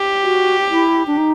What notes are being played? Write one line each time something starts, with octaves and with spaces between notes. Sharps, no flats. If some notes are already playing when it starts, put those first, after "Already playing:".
Already playing: G4
F#4
E4
D4
D#4